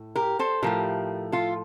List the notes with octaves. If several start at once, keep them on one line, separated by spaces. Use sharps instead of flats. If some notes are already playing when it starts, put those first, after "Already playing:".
Already playing: A2
G4 A#4
A4 C5
A2 F3 A3 G4 A#4
F4 A4